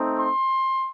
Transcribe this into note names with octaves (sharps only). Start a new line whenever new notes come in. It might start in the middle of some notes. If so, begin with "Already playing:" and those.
Already playing: A3 C4 D#4
C6